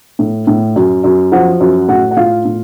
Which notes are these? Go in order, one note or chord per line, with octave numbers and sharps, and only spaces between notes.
A2
A2
F#2
F#2
F3 F#4 F#5
F#2
A2 F#4 F#5
F#5
A2 F4 F5
A2